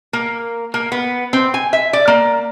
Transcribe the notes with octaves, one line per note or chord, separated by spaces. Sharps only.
A#3
A#3
B3
C4
G#5
E5
D5
A#3